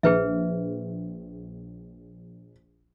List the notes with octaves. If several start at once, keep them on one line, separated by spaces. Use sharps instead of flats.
A#1 G#4 B4 E5